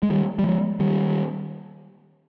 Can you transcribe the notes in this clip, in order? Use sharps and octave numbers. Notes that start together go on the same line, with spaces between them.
G#3
D#3 G3
G3
F3 G#3
D#3 G3